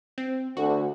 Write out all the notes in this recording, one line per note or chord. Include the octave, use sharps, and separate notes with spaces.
C4
D2 F#4